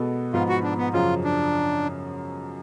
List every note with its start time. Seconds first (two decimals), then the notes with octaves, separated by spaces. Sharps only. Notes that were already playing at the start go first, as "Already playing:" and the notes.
Already playing: B2 G#3 B3 F#4 A4
0.33 G#2 F3 B3 F4
0.49 F#4
0.63 D4
0.78 B3
0.93 F#2 C#3 F3 F4
1.24 D4